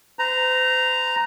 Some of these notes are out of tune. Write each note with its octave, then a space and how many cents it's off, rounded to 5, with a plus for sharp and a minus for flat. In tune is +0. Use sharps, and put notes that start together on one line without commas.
C5 -40 A#5 +0